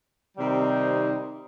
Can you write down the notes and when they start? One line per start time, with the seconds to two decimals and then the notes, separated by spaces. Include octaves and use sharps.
0.37 C3 D#3 G3 C4 D#4